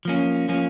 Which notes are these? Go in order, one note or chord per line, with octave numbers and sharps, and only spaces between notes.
F3 A#3 C#4
F3 A#3 C#4